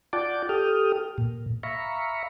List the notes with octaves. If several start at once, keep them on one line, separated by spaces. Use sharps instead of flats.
F4 D5 F#5 G5 A5 D6
G4 A4 G5 D#6 F6
A#2
E5 F5 A#5 B5 C#6